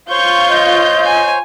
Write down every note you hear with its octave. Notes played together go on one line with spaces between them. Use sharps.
F4 C5 C#5 C#6 G6
D#5
G#5